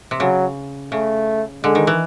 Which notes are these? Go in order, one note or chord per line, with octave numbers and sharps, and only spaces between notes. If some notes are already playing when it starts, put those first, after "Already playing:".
C3
C#3 F#3
C#3 A3
D3 G#3
D#3
E3